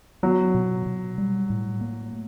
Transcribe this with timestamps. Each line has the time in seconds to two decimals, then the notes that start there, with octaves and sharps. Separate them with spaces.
0.23 F#3 B3
0.54 B2
0.86 B2
1.18 G3
1.50 A2
1.81 A#3
2.13 A3